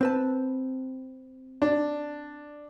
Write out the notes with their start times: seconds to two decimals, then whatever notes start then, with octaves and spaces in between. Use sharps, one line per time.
0.01 C4 B4 A5
1.62 D4